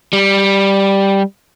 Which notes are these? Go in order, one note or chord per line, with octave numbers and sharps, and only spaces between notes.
G3